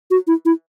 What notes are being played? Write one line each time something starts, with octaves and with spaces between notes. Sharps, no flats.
F#4
E4
E4